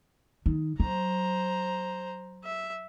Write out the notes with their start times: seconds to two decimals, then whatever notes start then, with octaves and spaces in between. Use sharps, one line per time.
0.46 D#3
0.80 F#3 C5 A#5
2.44 E5